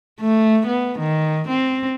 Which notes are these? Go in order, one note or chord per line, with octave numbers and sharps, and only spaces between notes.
A3
B3
D#3
C4